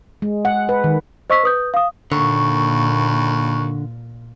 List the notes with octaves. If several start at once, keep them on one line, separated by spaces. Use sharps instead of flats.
G#3
F#5
B4
D#3
C5 D#5 C#6 E6 B6
B4 D#6 G6
F5 D#6
D#2 A#2 D3 C#6